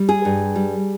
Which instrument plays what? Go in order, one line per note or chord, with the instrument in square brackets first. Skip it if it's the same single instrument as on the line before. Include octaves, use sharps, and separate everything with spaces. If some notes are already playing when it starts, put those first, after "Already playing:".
Already playing: [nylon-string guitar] G3
G#4
G2
G3